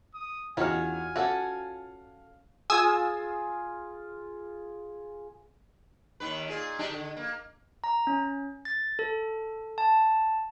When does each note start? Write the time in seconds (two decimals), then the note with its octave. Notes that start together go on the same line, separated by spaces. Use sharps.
0.14 D#6
0.57 E2 D#3 C#4 F4 F#4 C#5 G#5 F6
1.16 C#4 F#4 A4 C#5 D5 F5
2.70 F4 G#4 G#5 D#6 E6
6.20 D#2 D#3 B4
6.48 A#2 G#4
6.79 D4 D#4 G4
6.91 D3
7.17 A#3
7.84 A#5
8.07 C#4
8.65 A6
8.99 A4
9.78 A5